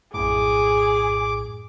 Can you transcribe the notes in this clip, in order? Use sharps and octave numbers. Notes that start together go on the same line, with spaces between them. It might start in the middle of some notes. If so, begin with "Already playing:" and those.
A#1 F#2 A2 G#4 D6